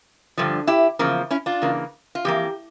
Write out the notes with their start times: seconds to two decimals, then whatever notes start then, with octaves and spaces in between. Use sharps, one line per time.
0.37 G2 D3 F3
0.67 E4 G4
0.99 E2 C#3 F3 A#3
1.31 C#4 E4
1.46 D4 F4
1.62 C#3 E3 A#3
2.15 F4
2.25 F2 E3 A#3 G4